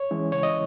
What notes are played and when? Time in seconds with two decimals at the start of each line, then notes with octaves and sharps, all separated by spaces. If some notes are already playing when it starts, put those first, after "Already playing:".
Already playing: C#5
0.11 E3 G#3 C#4 E4
0.32 C#3 C#5
0.43 D#5